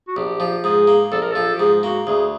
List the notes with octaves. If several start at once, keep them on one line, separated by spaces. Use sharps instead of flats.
F#4
A#1 G4
F3
G#2 G#4
A#3
A#1 A4
A#4
F3 A4
G4
G#2 G#4
A#3 F#4
D2 G#4